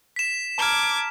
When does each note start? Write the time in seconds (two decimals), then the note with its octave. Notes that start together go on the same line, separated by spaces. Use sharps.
0.16 B6 E7
0.58 A5 A#5 D6 F6 G#6